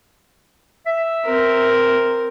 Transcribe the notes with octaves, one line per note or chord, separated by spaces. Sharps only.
E5
C4 A#4